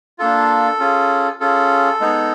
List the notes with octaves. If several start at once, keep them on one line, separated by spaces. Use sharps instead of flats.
A#3 D4 F4 A4
C#4 F4 G#4
C#4 F4 G#4 A4
G#3 B3 D#4 G#4